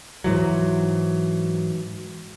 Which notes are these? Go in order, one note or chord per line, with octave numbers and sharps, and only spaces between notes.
G#2 E3 F#3